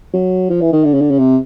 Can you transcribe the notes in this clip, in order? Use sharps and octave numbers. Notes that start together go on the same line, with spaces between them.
F#3
F3
E3
D#3
D3
C#3
D3
C#3
C3